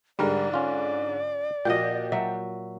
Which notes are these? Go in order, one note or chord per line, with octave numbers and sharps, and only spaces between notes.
G#2 D3 G3 G#3 A#4 D5
C#4 F4
A#2 F3 F#4 G4 D#5 G5
F#3 E5